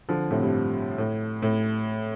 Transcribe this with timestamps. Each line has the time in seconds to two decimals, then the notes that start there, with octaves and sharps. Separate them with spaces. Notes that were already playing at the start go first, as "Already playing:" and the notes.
0.09 D3 F3
0.31 A2 C3
0.43 G2
0.98 A2
1.42 A2